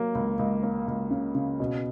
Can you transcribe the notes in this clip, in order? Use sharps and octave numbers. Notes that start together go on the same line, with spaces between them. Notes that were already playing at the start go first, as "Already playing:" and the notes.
Already playing: F#3 A#3
C#2
C#2
A#3
C#2
C#3
C#3
B2